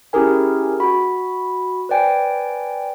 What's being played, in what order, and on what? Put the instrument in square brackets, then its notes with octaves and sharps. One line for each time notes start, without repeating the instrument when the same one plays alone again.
[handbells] C#4 E4 G4 G#4 A#4 G#5
F#4 B5
B4 C5 D5 G5 G#5